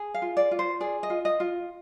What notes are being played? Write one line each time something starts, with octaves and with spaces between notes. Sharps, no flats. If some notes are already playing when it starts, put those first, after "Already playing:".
Already playing: G#4
F5
F4
D5
F4
C5
G#4 D5
D#5
F4
D#5
F4